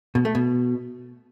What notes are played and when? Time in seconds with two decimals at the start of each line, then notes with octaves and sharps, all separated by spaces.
0.15 B2
0.25 A3
0.35 B2